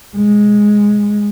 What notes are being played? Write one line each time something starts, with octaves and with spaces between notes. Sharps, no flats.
G#3